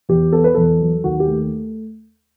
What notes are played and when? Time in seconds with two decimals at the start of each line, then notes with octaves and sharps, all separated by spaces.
0.09 E2 G4
0.32 B3 A4
0.44 B4
0.54 E2 A4
0.80 F#3
1.04 D#2 F#4
1.20 G4
1.28 A3